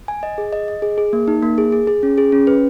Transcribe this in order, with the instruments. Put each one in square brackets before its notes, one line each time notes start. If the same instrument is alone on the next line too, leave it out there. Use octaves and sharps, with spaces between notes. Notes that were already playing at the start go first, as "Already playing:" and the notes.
[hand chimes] G#5
D#5
G#4
D#5
D#5
G#4
G#4
A#3
D#4
A#3
G#4
G#4
G#4
C#4
G#4
C#4
B4